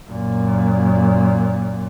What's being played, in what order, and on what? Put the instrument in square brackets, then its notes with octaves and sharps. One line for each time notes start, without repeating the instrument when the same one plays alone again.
[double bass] F#2 A#2